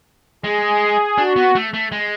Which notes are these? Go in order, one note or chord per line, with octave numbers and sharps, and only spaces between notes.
G#3 G#4
D4 F#4
B3
A3
A3
G#3